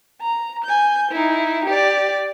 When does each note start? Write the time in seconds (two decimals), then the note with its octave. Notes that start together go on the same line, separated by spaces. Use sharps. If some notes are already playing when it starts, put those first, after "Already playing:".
0.21 A#5
0.65 G#5 G6
1.11 D#4 E4
1.66 G4 D5